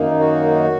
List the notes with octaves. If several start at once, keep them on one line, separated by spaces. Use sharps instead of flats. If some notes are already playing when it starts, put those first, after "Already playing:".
Already playing: F#2 D#3 A#3 D#4
F#4